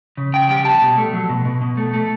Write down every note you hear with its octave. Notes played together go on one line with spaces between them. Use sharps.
C#3
C#3 G5
G3 G5
G3 A5
B2
A3
F#3
B2
B2
B2
A3
A3